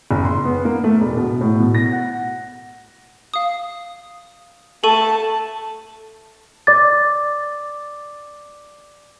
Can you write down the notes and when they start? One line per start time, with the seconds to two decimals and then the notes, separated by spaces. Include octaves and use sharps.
0.11 F#1
0.25 C6
0.45 B3
0.65 A#3
0.84 A3
1.00 E1
1.17 B2
1.41 A2
1.60 B2
1.75 A#6
1.92 F#5
3.34 F5 D#6
4.84 A3 A4 A5 C#6 D#7
6.67 D5 D6 A6